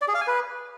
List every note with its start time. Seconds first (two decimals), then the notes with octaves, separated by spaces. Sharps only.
0.02 D5
0.08 G#4
0.14 F5
0.21 G#5
0.27 B4